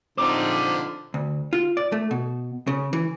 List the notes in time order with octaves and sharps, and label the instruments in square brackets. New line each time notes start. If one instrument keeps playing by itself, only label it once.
[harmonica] D3 F3 [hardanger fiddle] C4 D#4 [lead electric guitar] C5 A#5 [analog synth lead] D6
[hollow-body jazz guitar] D2
F4
D5
A3
B2
C#3
E3